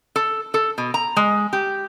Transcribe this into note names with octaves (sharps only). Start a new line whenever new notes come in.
A4
A4
B2
A#5
G#3
G4